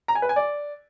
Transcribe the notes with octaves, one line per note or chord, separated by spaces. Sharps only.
A#5
G#5
B4
G#5
D5